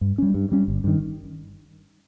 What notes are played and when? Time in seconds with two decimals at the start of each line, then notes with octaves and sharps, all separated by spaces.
0.01 G2
0.18 G3 C#4
0.34 G2
0.52 G3 C#4
0.68 G1
0.84 G2 D#3